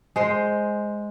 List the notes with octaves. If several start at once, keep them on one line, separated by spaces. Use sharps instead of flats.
G#3 C5